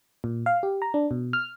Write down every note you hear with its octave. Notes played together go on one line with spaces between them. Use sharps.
A#2
F5
G4
A#5
D4
B2
F6